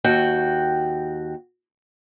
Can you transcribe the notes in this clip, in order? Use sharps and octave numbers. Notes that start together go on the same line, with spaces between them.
D#2 F#4 G5